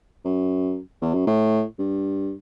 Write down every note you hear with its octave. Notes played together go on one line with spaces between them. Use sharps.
F#2
E2
F#2
A2
G2